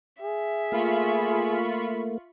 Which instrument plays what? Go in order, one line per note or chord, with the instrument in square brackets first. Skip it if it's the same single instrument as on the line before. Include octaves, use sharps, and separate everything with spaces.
[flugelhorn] G#4 [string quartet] E5
[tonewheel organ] A3 A#3 [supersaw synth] F4 B5 C#6